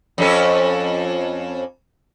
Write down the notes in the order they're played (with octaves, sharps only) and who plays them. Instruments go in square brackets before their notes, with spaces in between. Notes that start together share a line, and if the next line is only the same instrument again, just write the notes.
[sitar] F2 C#4 A4